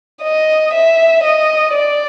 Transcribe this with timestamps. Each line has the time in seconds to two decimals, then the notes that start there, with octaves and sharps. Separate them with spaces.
0.23 D#5
0.73 E5
1.24 D#5
1.74 D5